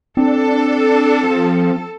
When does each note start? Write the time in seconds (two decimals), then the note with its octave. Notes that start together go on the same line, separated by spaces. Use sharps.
0.17 C4 D4 A4
1.23 F3